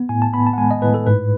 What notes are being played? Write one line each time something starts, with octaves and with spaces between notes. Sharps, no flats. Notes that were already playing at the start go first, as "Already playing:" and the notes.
Already playing: B3
A2 G#5
A5
B3 B5
A5
F#5
G#3 G#5
D#5
A2 B4
A4
G#2 B4